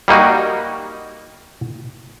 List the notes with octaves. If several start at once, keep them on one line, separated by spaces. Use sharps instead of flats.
G3 A#3 D#4 F#4